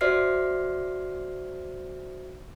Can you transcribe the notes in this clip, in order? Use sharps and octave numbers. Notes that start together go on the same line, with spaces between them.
F#4 C5 D5 E5 F6 C7